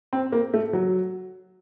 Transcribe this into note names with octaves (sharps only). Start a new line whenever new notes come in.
C4
A#3
A3
F#3